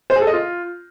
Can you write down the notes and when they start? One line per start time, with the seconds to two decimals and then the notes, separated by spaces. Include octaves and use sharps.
0.10 C5
0.16 G#4
0.21 A4
0.27 D#5
0.33 F4